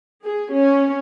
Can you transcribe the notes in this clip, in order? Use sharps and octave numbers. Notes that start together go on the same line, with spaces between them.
G#4
C#4